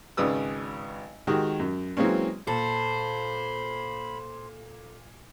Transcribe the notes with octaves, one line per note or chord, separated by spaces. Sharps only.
G#1 C#3 B4 D5 D#6 E6
D#3 G#3 F#4 G4
F#2
E3 F#3 G#3 A#3 C4 C#4
A#2 A4 C5 B5